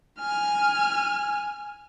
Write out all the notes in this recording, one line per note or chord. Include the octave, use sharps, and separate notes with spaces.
G#5 F6